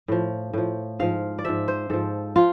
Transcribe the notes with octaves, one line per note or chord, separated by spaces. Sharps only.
A2 F3
A2 F3
G#2 F3 F5
D5
G#2 F3 E5
C5
G#2 F3 A4
F3 F4